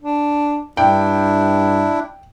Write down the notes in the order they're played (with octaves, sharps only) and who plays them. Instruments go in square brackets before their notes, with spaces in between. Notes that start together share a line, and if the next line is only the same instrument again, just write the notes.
[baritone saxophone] D4
[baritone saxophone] G2 [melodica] D4 E4 [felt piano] G5